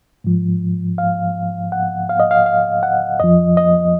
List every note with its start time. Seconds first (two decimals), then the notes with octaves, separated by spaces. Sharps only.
0.24 G#2 F3
0.98 F5
1.72 F#5
2.09 F5
2.20 D#5
2.31 F5
2.46 F5
2.83 F#5
3.20 F2 F3 D#5
3.57 D#5